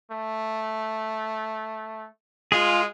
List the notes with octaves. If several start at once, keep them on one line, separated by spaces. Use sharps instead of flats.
A3
G#3 F4 G#4